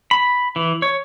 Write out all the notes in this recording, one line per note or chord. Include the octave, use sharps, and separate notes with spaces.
B5
E3
C#5